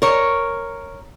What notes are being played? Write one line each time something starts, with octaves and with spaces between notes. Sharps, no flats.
A#4 C#5